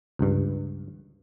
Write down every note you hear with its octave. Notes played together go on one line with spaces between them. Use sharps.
C#2 G2